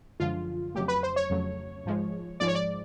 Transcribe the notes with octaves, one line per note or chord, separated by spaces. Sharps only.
F#2 D3 F3 G#3 F4
F2 C#3 F#3 A3 G4
B4
C5
C#5
F2 C#3 F#3 A3
G#2 F3 G#3
G#2 F3 G#3 D5
C#5
D5